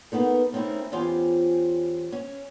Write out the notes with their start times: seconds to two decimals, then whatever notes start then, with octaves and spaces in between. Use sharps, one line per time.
0.12 A#3 B3 D#4 A4
0.52 A3 A#3 C4 C#4 D#4 E4
0.92 E2 C#4 F4 G4 C5 G#5
2.12 C#4